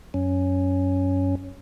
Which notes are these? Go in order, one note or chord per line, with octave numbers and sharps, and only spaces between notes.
F#2 C#4